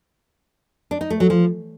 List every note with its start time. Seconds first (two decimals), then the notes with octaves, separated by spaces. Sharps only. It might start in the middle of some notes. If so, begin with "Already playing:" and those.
0.91 D4
1.01 D#4
1.10 A3
1.20 F#3
1.30 F3